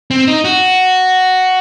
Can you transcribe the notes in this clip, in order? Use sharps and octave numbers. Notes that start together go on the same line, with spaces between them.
C4
D#4
F#4